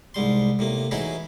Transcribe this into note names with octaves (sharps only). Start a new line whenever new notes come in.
C2 G#2 G3 C6
A2 C3 A#3
E3 F#3 C#4 D#4 E4 G#4